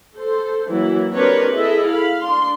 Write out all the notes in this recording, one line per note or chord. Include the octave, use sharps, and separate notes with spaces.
A4 C5
E3 F#3 A#3 E4
C4 D4 G4 A#4 B4 C#5
E4 G#4 A4 D#5 E5
F5 B5
D4 C6